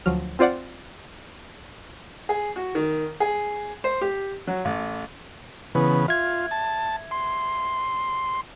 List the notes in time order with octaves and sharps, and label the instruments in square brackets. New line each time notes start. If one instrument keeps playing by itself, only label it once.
[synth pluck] D2 F3 F#3 F6
C4 F4 C5 D5 F#5
[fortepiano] G#4
F#4
D#3
G#4
C5
G4
F#3
A1
[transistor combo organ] C#3 B3 [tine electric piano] E3
[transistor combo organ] F4 [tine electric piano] E5 G#6
[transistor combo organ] A5
C6